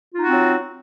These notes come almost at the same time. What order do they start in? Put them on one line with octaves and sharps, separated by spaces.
F4 D#4 F#4 C4 F#3